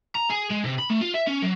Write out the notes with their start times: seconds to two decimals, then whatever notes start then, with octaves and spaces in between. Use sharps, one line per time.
0.15 A#5
0.30 G#4
0.50 G#3
0.64 C3
0.78 B5
0.90 A3
1.01 F4
1.14 E5
1.27 C#4
1.42 F#3